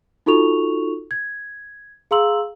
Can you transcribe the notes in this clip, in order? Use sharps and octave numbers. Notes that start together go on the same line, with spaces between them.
D#4 F4 F#4 A4 C#6 F7
G#6
G#4 F5 A#5 C6 E6 F#7